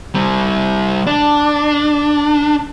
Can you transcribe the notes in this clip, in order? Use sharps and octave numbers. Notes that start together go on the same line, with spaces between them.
G3 C4
D4